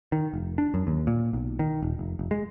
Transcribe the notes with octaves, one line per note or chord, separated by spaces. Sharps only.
D#3
F1
D4
F#2
D#2
A#2
B1
D#3
D#1
F1
F1
G#3